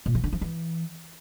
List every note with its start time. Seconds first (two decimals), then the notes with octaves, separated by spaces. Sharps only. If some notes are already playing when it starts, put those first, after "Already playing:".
0.06 A#2
0.15 E3
0.24 D3
0.33 F3
0.41 E3